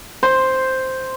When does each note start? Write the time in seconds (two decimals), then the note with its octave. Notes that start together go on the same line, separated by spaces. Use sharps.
0.23 C5